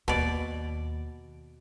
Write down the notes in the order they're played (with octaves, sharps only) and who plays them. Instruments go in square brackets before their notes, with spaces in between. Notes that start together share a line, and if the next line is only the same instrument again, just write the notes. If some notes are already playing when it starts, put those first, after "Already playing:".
[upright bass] D#2 [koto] B2 D5